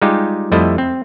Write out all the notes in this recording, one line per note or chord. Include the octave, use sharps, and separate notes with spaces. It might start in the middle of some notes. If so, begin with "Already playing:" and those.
G3 G#3 D#4 F4 G4
F2 G3 A3 E4 C5 D#5
C4